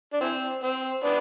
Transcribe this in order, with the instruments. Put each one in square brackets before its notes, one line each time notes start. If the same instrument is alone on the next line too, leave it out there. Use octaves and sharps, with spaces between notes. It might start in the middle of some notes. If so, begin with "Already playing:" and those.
[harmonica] D4
E3 C4
C4
B3 D4